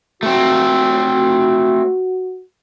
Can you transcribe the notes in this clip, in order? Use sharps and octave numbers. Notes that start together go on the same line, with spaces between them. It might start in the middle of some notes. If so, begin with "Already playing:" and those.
A3 C4 F#4